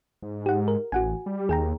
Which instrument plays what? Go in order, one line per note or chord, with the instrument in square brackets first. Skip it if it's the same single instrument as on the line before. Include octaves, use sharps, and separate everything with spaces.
[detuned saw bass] G#2
[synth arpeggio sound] G4 F#5
A#4
[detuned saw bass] A1 [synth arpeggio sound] F#4 F#5 G#5
[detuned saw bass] G3
[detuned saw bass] D#2 [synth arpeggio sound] G#4 G5 A#5